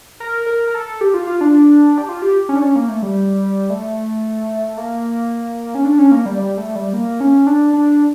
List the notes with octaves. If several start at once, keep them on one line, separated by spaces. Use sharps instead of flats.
A#4
A#4
A#4
A4
G4
F4
F4
D4
G4
F4
G4
C#4
D4
C#4
A#3
A3
G3
A3
A#3
C#4
D4
C#4
A#3
G3
G3
A3
G3
A#3
C#4
D4
D4